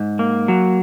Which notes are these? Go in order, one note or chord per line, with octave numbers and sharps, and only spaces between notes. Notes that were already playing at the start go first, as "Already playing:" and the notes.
Already playing: G#2
A#3
F#3